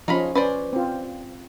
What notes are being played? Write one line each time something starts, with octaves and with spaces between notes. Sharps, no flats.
F3 C#4 D#4 F4 B5
C#4 B4 C5 D5
C4 F4